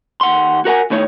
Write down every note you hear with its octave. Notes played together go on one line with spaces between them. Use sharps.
D#2 F#5 C6
F#4 A#4 F#5 G#5
D#2 A2 D#4 C#5